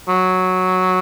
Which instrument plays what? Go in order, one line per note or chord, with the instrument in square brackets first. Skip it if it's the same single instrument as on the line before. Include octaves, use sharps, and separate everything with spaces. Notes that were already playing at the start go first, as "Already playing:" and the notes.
[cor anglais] F#3